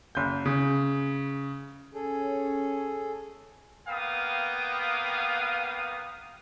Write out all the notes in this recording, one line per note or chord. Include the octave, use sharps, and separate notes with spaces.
F#1 G6
C#3
C#4 G#4 A4
A#3 B3 F5 G5 D#6